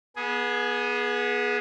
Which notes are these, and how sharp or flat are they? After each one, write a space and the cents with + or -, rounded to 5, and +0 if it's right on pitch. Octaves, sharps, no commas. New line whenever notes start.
B3 -25 G#4 +10